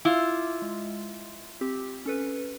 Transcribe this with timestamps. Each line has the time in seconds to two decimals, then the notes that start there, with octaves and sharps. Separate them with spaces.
0.05 E4 F4 D6
0.62 G#3
1.61 C4 G4
2.06 C#4 A4 B4